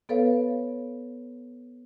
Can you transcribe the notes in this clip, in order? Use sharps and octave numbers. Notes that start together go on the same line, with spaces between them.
B3 A4 B4 C#5 F5